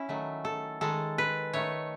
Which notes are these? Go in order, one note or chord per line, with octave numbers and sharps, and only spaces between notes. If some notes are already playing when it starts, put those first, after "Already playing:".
Already playing: C#4 E4
D#3 F#3 A3
A4
D#3 G#3 A4
B4
D#3 A3 C#5